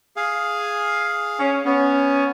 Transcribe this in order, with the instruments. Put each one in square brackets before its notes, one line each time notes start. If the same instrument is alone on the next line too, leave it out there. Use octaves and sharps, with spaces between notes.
[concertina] G#4 F5
[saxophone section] C#4
[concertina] B3 [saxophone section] C#4